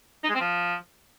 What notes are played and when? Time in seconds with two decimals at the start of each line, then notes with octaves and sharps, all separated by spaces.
0.24 D#4
0.29 G#3
0.35 C4
0.40 F3